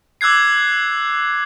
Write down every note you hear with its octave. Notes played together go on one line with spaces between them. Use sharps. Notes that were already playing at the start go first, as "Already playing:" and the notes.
D6 E6 F#6 G#6 C7